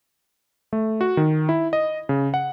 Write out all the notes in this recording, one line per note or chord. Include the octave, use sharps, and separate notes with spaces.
A3
F#4
D#3
E4
D#5
C#3
F#5